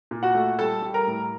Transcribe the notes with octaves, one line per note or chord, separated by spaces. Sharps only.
A#2
F#4 F#5
A3
G3 A4 A5
G3
A#4 A#5
A2